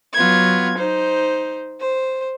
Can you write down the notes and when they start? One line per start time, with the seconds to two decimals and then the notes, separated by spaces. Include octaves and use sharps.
0.13 F#3 B3 F4 G#6
0.76 D#4 C5
1.80 C5